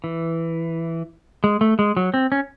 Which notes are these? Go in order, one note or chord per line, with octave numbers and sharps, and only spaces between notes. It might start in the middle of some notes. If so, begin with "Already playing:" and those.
E3
G#3
A3
G#3
F#3
C4
C#4